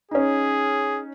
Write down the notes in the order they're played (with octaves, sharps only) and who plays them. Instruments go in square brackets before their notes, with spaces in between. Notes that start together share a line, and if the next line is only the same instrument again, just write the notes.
[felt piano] C#4 D#4 [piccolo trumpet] G#4